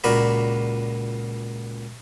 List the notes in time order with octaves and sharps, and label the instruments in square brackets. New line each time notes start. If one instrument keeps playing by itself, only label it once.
[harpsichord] C#2 A#2 F#4 A#4 D5 B5